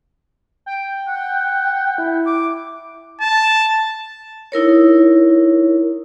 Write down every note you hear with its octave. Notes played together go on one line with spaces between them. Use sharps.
G5
F#5
E4
D6
A5
D#4 E4 A#4 C#5